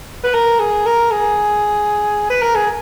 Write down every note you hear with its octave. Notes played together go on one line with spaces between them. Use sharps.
B4
A#4
G#4
A#4
G#4
B4
A#4
G#4